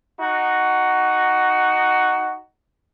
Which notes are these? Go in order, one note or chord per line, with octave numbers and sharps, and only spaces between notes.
D#4 F#4